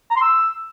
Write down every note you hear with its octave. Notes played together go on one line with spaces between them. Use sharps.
A#5
C6
E6